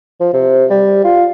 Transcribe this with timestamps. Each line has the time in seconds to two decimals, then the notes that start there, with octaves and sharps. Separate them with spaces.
0.20 F3
0.34 C3
0.70 G3
1.04 F4